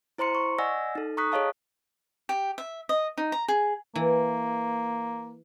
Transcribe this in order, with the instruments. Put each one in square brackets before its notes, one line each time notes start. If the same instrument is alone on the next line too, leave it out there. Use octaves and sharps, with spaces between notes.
[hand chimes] E4 C5 A#5 C6 C#7
C#6
D5 D#5 F#5 G#5 E6 A#6
D#4 A4
A#5 C#6 D#6 F#6 B6
G#4 C#5 D#5 F5 A5
[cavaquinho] G4
E5
D#5
D#4
A#5
G#4
[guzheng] E3 [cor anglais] A#3